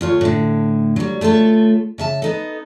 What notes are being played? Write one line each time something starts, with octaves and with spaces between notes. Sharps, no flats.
D2 F4 C#5
A2 D3
F#3 G3
A3 F4 G#4 A4 C#5
C#3 E5 A5
B3 D#4 A4